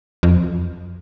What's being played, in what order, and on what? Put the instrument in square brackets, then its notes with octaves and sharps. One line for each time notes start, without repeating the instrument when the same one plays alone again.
[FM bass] F2